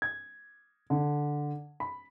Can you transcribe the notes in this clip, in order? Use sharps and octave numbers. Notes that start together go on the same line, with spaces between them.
G#6
D3
B5